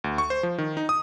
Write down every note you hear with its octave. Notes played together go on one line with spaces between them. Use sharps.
D2
C#6
C5
F3
D#3
D#4
D#6